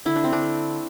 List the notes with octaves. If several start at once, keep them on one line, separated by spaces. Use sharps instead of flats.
D3 E4
D4
C4
D4
A3